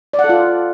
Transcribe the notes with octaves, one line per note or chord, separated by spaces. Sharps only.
D5
F#5
A4
F4